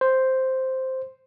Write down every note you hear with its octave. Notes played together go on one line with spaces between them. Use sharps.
C5